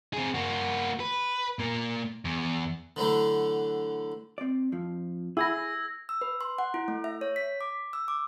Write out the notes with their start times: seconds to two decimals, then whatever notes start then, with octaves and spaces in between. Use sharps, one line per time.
0.13 C4 G#4
0.35 A#3 F#4
1.00 B4
1.59 A#2 A#3
2.25 E2
2.96 D3 E3 F#3 A3
4.38 C4 D5
4.72 F2 F3
5.37 E4 G#4 E6 G#6 A#6
6.09 E6
6.21 B4
6.41 C6
6.58 F#5
6.74 E4
6.88 A3
7.04 E5
7.21 C#5
7.36 B6
7.61 D6
7.93 E6
8.08 D6